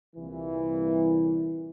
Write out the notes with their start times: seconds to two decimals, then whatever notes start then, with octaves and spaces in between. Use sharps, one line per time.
0.16 C2 A#2 E3